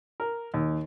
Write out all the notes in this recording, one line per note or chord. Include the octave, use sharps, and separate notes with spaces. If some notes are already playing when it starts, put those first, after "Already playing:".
A#4
D#2